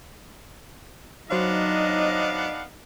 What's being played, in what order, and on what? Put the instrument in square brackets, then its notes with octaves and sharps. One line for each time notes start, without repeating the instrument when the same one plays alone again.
[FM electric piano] F#3 C5 C#5 [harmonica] B3 D4 F5 [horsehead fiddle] D#4 D#5